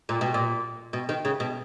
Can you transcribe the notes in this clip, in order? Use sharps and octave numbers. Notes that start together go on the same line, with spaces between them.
A#2
B2
A#2
B2
D#3
C#3
B2